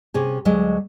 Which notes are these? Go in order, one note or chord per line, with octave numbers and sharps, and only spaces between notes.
C3 C#4 G#4
D2 F#3 G#3 D#5